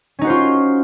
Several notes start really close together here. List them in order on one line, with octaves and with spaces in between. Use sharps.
C#4 D#4 F#4 C5 F4